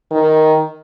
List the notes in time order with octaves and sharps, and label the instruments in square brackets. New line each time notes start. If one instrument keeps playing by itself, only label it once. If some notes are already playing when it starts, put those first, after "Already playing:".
[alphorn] D#3